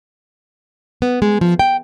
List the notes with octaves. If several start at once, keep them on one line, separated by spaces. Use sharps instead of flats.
B3
G#3
F3
G5